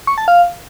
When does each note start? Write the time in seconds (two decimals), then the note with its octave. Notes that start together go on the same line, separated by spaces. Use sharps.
0.07 C#6
0.18 A5
0.28 F5